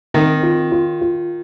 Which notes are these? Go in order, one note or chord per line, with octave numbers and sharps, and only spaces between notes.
D#3 C4
F4
F4
F4